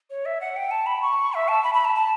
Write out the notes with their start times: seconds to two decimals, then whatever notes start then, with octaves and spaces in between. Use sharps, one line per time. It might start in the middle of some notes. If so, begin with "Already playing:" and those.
0.10 C#5
0.26 E5
0.41 F#5
0.56 G5
0.71 A5
0.86 B5
1.02 C#6
1.34 E5
1.48 A5
1.63 B5
1.74 B5
1.85 A5
1.95 A5